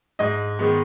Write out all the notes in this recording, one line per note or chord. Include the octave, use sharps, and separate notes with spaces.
G#2 D#5
D#3 G#3 B3